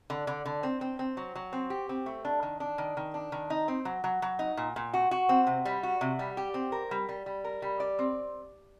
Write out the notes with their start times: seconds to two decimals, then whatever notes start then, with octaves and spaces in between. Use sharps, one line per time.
0.10 D3
0.27 D3
0.45 D3
0.63 C4
0.81 C4
0.99 C4
1.17 F#3
1.35 F#3
1.53 C4
1.70 G4
1.89 C4
2.06 A3
2.25 D4
2.43 D#3
2.60 D4
2.78 D#3
2.97 D#3
3.14 D4
3.32 D#3
3.50 D#4
3.68 C4
3.85 F#3
4.04 F#3
4.22 F#3
4.39 D#4
4.57 A#2
4.76 A#2
4.94 F#4
5.11 F#4
5.29 C4
5.47 C3
5.65 G3
5.83 F#4
6.01 C3
6.19 G3
6.37 G4
6.54 C4
6.72 A#4
6.91 G3
7.09 G3
7.26 G3
7.44 A#4
7.62 G3
7.80 D5
7.99 C4